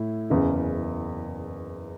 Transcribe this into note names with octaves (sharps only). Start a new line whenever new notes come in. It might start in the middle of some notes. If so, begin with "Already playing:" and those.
Already playing: A2 E4
F#1 E2 C#3